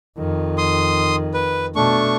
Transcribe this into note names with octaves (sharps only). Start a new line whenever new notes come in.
F2 D#3
C6 D#6
B4
B2 A3 D4 C#6